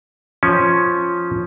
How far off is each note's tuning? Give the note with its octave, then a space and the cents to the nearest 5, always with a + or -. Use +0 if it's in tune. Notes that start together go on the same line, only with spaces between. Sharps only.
F3 +0 C#4 +0